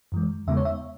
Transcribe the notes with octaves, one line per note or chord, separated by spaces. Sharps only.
F#2 E3 G#3
E2 C#3 G#3 B3 D#4 E5
C#5
E5